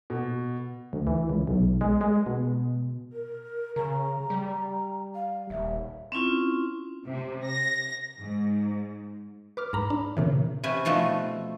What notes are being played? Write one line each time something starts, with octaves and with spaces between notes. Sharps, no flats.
B2
D2
E3
C#2
B1
G#3
G#3
B2
A#4
C#3 A#5
G3
F5
D#1 E5
C4 C#4 E4 F4
C3
A#6
G#2
B4 D6 F6
G#2 A#5 B5
D4
A#2 C#3 E3
C3 C#4 B4 G#5
B2 F3 A3 F#4